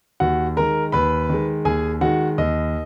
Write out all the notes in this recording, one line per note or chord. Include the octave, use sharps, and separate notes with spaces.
D#2 F#4 F#5
D#3 G#3 A#4 A#5
D#2 B4 B5
D#3 G#3
D#2 G#4 G#5
D#3 G#3 F#4 F#5
D#2 D#5